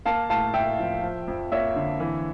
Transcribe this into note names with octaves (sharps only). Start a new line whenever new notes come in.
A#3 F5 A5
A2 F5 A5
A2 E5 G5
F3
F3
F2
A#3 C#5 E5
D3
E3